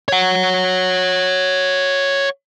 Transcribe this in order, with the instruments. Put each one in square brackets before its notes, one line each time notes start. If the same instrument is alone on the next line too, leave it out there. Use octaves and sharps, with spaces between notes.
[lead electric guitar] C#5 F#5